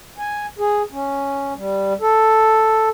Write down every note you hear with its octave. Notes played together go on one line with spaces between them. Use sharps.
G#5
G#4
C#4
G3
A4